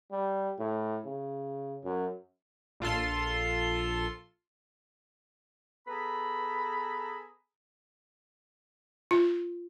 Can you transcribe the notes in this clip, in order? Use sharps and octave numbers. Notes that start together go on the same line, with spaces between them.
G3
A2
C#3
F#2
A#1 F4 A4 C6
B3 G#4 A4 B4 A#5 B5
F4